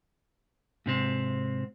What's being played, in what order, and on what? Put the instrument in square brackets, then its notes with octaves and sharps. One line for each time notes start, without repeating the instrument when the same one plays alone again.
[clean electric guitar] G#2 C3 C4